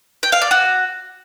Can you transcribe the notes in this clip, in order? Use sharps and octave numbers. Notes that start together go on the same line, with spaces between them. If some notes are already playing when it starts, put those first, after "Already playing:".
G5
F5
D5
F#4